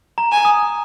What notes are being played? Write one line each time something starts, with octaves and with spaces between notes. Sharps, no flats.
A#5
G#5
D#6